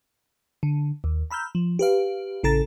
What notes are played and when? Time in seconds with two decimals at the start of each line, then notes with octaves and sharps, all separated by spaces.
0.63 D3
1.04 D#2
1.31 A#5 B5 E6 F6 G6
1.55 F3
1.79 G4 B4 F5
2.43 A1 C#3 A4 A#5 A6